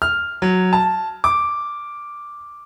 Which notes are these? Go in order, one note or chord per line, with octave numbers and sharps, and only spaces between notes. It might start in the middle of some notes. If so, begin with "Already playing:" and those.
F6
F#3
A5
D6